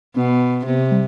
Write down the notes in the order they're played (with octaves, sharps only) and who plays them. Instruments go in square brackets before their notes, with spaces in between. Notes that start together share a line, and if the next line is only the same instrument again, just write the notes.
[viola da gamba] B2 [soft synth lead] B3
[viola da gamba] C3 [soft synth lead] B3
[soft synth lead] G3